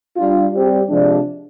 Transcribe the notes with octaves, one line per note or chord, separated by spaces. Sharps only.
G3 D4 F4
G3 C4 G4
C3 F3 G#3 D4